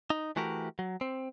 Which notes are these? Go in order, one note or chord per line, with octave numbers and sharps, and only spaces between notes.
D#4
E3 A3 F#4 G4 A#4
F#3
C4